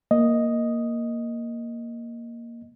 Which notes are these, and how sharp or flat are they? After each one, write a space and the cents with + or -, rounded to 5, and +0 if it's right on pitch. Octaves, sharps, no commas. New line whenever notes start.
A#3 +0 D#5 +0